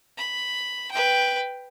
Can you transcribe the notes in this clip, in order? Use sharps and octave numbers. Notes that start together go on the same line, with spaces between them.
B5
B4 G5